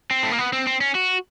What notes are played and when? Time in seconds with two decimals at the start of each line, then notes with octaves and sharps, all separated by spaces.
0.11 C4
0.23 A3
0.31 A#3
0.38 B3
0.53 C4
0.67 C4
0.81 C#4
0.95 F#4